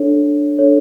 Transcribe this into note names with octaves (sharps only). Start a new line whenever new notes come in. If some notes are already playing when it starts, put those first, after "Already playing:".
Already playing: D4 A4 C#5
D4 A4 C#5